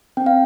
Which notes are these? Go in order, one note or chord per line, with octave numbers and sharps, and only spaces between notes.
C4 G5
F5